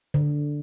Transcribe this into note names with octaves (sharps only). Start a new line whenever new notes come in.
D3